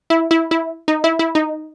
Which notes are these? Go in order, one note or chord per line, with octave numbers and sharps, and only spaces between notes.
E4
E4
E4
D#4
E4
E4
D#4